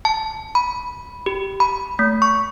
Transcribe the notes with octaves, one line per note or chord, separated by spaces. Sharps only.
A5
B5
G4
B5
A3
C#6